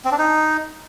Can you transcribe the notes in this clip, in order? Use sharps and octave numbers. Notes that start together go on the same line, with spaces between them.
C4
D4
D#4